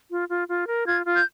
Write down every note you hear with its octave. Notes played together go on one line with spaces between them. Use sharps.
F4
F4
F4
A#4
F4 G#6
F4
G6